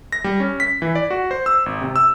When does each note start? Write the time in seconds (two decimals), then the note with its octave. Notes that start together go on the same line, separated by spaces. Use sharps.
0.12 A#6
0.24 G3
0.40 C#4
0.60 B6
0.82 E3
0.95 D5
1.10 F#4
1.31 C5
1.46 E6
1.66 G#1
1.81 C3
1.96 E6